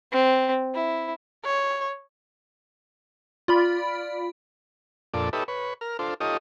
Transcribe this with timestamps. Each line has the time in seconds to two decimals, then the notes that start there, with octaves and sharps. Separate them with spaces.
0.12 C4
0.75 E4
1.45 C#5
3.48 F4 D5 B5
5.14 F2 A#2 D4 A4 D5
5.33 D#4 G4 A4 B4 C#5 E5
5.48 B4 C#5
5.81 A#4 F6
5.99 D4 F4 A4 C5
6.20 D#4 F4 G4 A4 C#5 D#5